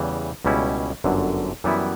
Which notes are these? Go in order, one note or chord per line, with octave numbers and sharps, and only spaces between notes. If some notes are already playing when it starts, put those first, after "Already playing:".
Already playing: E2 C#3 E3 G3
C#2 B2 G3 C#4 E4
G1 F#2 D3
F#2 E3 G3 B3 E4